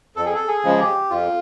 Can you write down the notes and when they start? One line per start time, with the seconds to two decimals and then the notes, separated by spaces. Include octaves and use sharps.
0.16 F2 A4
0.25 G#4
0.35 A4
0.48 G#4
0.64 C#3 F3 G#3
0.79 G4
1.10 F2 F4